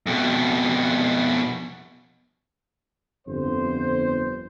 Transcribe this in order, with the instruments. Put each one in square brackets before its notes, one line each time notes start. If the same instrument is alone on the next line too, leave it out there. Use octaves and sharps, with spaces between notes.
[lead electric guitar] F2 B2
[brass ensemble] G1 F2 C5